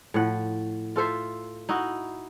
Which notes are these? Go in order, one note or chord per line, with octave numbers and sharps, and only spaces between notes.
A2 F3 F#5
F4 A4 C5 E5
D#4 E4 F#4